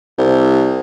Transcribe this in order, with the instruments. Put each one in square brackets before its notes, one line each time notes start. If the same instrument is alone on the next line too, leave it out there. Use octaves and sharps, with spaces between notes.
[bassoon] C2